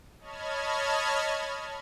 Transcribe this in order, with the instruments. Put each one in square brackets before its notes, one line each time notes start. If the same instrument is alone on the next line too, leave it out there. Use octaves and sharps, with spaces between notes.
[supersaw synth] C#5 D#5 A5 B5 F6 G#6